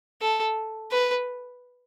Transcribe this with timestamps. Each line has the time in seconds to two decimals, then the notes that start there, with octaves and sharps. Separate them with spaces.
0.21 A4
0.92 B4